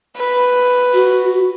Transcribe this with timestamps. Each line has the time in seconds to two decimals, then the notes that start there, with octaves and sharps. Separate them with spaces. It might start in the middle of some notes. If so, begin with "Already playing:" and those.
0.17 B4
0.94 F#4